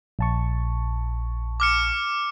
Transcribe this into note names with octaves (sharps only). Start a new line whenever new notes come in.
A#1 A5 C#6
D6 F6 C#7